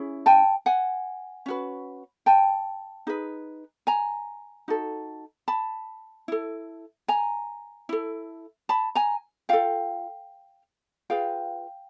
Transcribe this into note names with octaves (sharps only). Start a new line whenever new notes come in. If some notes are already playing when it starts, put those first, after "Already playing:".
Already playing: C#4 E4 G#4
G5 A5
F#5 G#5
C#4 F#4 B4
G5 A5
D#4 G#4 B4
G#5 A#5
D#4 F#4 A4
A5 B5
E4 A4
G#5 A#5
E4 A4
A5 B5
G#5 A#5
F4 A4 F5 G5
F4 G#4 B4 F5 G5